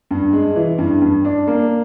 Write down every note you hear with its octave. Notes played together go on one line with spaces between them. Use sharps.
G2
G#3
E3
G2
G2
D4
A#3